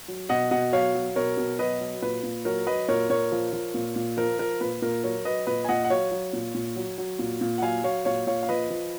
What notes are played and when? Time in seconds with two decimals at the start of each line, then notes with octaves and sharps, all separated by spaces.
0.08 F#3
0.29 B2 D#5 F#5
0.51 B2 D#5 F#5
0.73 F#3 C#5 F5
0.95 F#3
1.16 B2 A#4 C#5
1.37 B2
1.59 F#3 B4 D#5
1.80 F#3
2.02 A#2 B4
2.23 A#2
2.45 F#3 A#4 C#5
2.67 F#3 B4 D#5
2.88 A#2 A#4 C#5
3.10 A#2 A#4 C#5
3.32 F3
3.53 F3
3.74 A#2
3.96 A#2
4.17 F3 A#4
4.39 F3 A#4
4.61 A#2 B4
4.82 A#2 A#4
5.04 F#3 A#4 C#5
5.25 F#3 B4 D#5
5.47 A#2 B4 D#5
5.64 G#5
5.69 A#2 D#5 F#5
5.84 F#5
5.90 F#3 C#5 F5
6.11 F#3
6.33 A#2
6.55 A#2
6.76 F#3
6.98 F#3
7.19 A#2
7.41 A#2
7.58 F#5
7.62 F#3 F5 G#5
7.84 F#3 C#5 F5
8.05 A#2 C#5 F5
8.27 A#2 C#5 F5
8.43 F5
8.49 F3 B4 D#5
8.70 F3